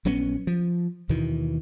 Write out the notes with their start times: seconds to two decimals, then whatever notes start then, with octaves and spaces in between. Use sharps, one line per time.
0.05 A#1 F#3 B3 C#4
0.47 F3
1.09 D#2 B2 D#3 E3